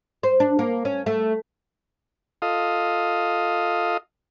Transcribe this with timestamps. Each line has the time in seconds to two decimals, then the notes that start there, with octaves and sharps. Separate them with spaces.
0.23 C5
0.40 D4
0.59 A#3
0.85 C#4
1.06 A3
2.42 F4 A4 D#5 F5 D#6